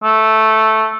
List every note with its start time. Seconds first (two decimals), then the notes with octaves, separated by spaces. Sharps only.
0.03 A3